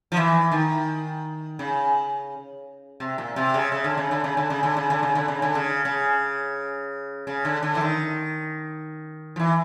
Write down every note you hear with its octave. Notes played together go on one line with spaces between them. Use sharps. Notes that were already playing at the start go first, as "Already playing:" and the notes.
F3
E3
D#3
C#3
C3
A#2
C3
C#3
C#3
D3
C#3
D3
C#3
D3
C#3
D3
C#3
D3
C#3
D3
C#3
D3
C#3
C#3
C#3
D3
D3
E3
D#3
F3
E3